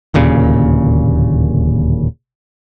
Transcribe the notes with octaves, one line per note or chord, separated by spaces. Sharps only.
D1 D#2 A#2 C#3